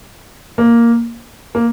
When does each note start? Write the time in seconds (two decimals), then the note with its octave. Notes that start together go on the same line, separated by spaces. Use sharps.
0.58 A#3
1.55 A#3